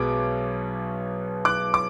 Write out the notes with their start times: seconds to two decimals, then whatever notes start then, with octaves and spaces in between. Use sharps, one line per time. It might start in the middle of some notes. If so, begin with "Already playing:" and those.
Already playing: B1 B2 G#3 B3 D6
1.45 D6 F#6
1.74 D6